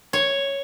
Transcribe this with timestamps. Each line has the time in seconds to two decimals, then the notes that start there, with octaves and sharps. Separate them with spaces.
0.13 C#5